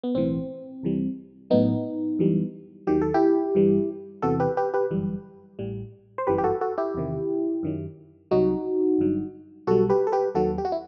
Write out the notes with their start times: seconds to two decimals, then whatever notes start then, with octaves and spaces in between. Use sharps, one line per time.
0.03 B3
0.15 B1 A2 E3 C4
0.83 C2 C3 E3 G3
1.50 A1 A2 F#3 B3 D#4
2.19 F#2 E3 G3
2.87 D#2 D#3 F#3 G4
3.01 A4
3.14 E4 G4
3.55 G1 G2 E3 G3
4.22 E2 C3 E3 F#4 A4
4.40 G4 B4
4.57 G4 B4
4.74 G4 B4
4.91 G1 F#2 E3 G3
5.59 A1 A2 G3
6.18 C5
6.27 G1 F#2 E3 G3 G4 B4
6.38 G4
6.44 F#4 A4
6.61 F#4 A4
6.78 E4 G4
6.94 E2 C3 D#3
7.63 F#2 D#3 F#3
8.31 C2 C3 F#3 D#4 F#4
8.98 G1 G2 F#3
9.67 B1 B2 G3 F#4 A4
9.89 G4 B4
10.07 A4
10.12 G4 B4
10.35 D#2 D#3 F#3 F#4 A4
10.58 G4
10.65 F#4
10.72 E4